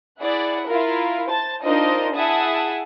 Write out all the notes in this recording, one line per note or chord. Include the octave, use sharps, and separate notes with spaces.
E4 G#4 D5 F#5
E4 F4 A#4
C5 A5 A6
D4 D#4 F4 A#4 C5 D#5
E4 G#4 E5 F#5 A5 D#6